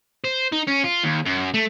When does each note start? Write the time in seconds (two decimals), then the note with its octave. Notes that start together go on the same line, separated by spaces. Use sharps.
0.24 C5
0.52 D#4
0.67 C#4
0.84 F4
1.03 D#2
1.26 F#2
1.54 A3